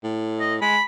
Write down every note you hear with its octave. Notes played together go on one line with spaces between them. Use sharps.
A2
D#5
G#3 B5